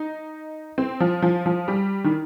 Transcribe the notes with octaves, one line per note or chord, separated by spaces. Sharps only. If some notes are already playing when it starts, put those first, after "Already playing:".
Already playing: D#4
C4
F3
F3
F3
G3
D#3